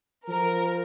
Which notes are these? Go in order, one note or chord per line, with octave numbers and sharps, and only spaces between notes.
F3 A#4